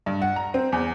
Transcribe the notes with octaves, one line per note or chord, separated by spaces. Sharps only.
G2
F#5
A#5
C4
E2